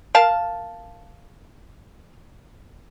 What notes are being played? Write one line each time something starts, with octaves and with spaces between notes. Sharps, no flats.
A#4 F5 A5